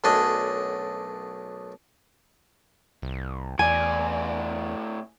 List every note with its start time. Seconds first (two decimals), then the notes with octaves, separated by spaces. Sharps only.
0.04 B1 F#2 A3 D4 D5 D#5
3.02 C2
3.59 E2 A2 D5 G#5